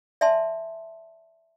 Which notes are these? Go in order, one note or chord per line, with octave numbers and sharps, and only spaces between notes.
D5 E5 G#5 A5 C6